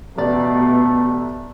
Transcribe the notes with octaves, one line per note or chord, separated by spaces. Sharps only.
A1 B2 A3 D5